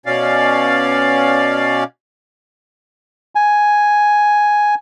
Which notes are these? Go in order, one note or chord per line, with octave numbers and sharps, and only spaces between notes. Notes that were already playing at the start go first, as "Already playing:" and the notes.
B2 C#4 D5 F5
G#5